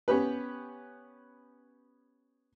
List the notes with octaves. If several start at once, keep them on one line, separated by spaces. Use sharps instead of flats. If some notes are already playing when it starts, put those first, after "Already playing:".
B3 C#4 G4 B4